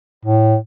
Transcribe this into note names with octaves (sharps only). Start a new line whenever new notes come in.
A2